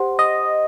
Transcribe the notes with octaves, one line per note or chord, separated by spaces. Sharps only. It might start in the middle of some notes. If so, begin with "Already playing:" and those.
Already playing: G4 C5 F#5 C6
D#5